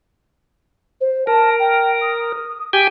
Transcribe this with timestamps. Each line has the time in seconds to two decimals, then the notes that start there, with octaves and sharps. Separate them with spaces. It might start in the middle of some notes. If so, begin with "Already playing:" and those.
1.01 C5
1.27 A#4 A5
1.59 G5
2.02 D#6
2.73 G4 G5 G#5